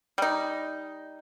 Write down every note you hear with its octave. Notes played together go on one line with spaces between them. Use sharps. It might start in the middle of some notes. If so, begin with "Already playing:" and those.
G3 D#4